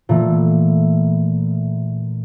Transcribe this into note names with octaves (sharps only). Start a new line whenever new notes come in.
A#2 E3 A3